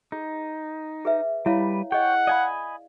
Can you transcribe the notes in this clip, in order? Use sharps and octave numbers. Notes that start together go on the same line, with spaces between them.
D#4 G#4
G#4 B4 E5
G3 E4 B4 C#5 F5
G#4 C#5 D#5 F#5 G5
D5 D#5 F5 G#5 B5